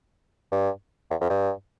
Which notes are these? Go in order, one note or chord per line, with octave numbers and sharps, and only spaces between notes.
G2
E2
F2
G2